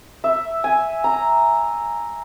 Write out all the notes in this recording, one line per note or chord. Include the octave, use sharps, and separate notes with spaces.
E5
G#5
A#5